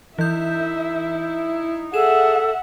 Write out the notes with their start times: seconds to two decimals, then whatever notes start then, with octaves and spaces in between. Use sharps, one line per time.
0.19 E3 D#4 E4 E5 G6
1.94 G#4 A4 E5 F#5 E7